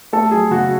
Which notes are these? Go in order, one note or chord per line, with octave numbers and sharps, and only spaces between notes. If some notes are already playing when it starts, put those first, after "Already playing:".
A3 A4
F#3 G#4
C#3 F#4